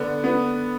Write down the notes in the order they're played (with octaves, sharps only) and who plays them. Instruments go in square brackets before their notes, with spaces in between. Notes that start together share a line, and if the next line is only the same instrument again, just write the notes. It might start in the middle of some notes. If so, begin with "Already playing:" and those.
Already playing: [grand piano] D3 [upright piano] B3
[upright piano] B3